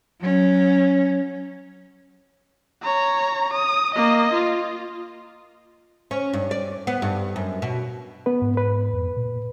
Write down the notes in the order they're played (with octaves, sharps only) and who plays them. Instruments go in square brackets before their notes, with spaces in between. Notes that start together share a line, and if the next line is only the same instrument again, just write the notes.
[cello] F#3 C#4
[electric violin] C#5 A#5
D#6
A#3 D#5
F4
[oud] C#4
G2
D5
B3
G2
F#2
B2
[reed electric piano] B3 B4
[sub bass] G#2
[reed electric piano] B4
[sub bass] F2
A#2